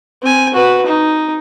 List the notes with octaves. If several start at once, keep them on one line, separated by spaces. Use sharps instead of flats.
C4 G#5
F#4 B4
D#4